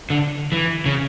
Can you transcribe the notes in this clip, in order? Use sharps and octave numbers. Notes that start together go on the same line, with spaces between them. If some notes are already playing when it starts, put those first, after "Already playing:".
D3
E3
C#3